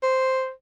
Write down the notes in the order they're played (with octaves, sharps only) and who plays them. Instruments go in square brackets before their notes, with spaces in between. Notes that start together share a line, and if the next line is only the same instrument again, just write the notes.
[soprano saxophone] C5